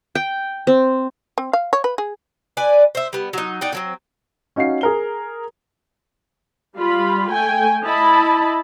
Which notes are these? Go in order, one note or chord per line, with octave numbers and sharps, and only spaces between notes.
G5
C4
C4
F5
C#5
B4
G#4
B4 D5 G#5
C5 E5
G3 B3
F#3 D#4
D#4 D5 F#5 G5
D3 F#3 C4
C#4 D#4 F#4 F5 C7
G#4 A#4 G7
G3 F4 B5
A3 G5 G#5
E4 D#5 A5 B5